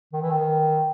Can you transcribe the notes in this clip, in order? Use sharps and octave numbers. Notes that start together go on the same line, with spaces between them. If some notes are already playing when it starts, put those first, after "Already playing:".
D#3
E3
D#3